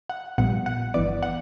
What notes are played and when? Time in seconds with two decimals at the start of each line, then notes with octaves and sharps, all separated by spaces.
0.09 F#5
0.38 A#1 A#2 G3 B3 F#5
0.66 F#5
0.94 G1 G2 E3 B3 D5
1.23 F#5